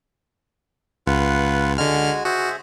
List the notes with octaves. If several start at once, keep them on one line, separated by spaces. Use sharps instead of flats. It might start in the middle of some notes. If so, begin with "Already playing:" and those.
C#2 F4 B4 F#5
D3 G#3 F#4 G#5 F6
F#4 G#4 C5 E5